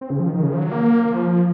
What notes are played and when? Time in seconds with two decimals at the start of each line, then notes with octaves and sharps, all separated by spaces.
0.01 C4
0.10 C#3
0.20 F3
0.29 D#3
0.43 C#3
0.53 F3
0.58 F#3
0.71 A#3
1.13 F3